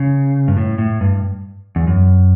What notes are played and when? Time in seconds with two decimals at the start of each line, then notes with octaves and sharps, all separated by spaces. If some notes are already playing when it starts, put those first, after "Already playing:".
Already playing: C#3
0.48 G2
0.57 A2
0.78 A2
1.01 G2
1.76 E2
1.87 F#2